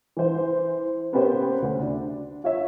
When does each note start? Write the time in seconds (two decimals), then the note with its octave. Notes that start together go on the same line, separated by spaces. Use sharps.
0.17 E3 C5
1.12 A#3 B3 C#4 G4 C5 C#5
1.62 D2
1.80 D4
2.44 F4 C#5 E5